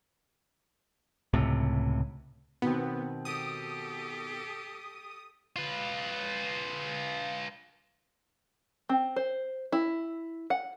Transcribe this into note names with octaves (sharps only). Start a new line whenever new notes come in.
C#2 A2 C3
B2 D#3 B3 C4
G4 A4 D#6
F4 B4
C4
C5
E4
F#5